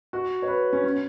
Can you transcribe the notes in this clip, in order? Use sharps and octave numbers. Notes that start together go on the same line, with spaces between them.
F#4
C#5
B4
C#4
C#4